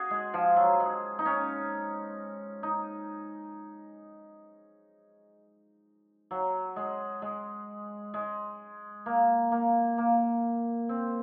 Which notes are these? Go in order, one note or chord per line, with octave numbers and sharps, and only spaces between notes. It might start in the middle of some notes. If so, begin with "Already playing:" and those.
Already playing: F#4 G#4
G#3
F3
F#3
G#3
D#4
C#4
D#4
F#3
G#3
G#3
G#3
A#3
A#3
A#3
C4